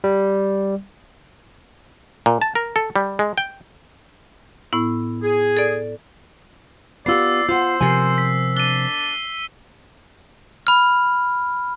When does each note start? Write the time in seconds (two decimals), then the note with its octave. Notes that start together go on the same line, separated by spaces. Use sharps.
0.04 G3
2.26 A#2
2.42 A5
2.55 A#4
2.76 A4
2.96 G3
3.19 G#3
3.38 G5
4.73 A2 B3 E4
5.22 G#4
5.57 A4 D5
7.06 B3 F4 G4 D5 E6 C7
7.49 F4 C5 F#5
7.81 C3 F3 A#4 G#5
8.18 B6
8.57 D4 D#7 G7
10.67 B5 F6